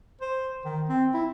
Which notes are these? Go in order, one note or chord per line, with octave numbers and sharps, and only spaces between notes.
C5
D#3
C4
E4